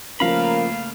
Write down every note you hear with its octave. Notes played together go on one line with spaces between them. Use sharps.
C#3 F3 A3 A#3 C#4 A#4 F5 B5